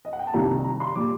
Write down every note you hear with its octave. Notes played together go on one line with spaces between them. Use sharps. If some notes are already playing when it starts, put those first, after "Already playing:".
D#5
F#5
G5
A5
C2 C3 D#3 G3 A#5
A#5
C6
A#2 G3 D6